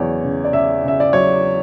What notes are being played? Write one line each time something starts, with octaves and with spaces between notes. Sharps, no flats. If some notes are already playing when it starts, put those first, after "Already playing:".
Already playing: E2 C#3 F#3 C#5 D5
C#3
D5
C#3 E5
C#3 E5
D5
F#3 C#5